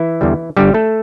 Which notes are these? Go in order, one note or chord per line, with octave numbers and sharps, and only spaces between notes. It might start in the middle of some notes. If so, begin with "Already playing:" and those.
Already playing: E3 E4
E2 D3 G3
G1 G2 D3 G3 G4
A3 A4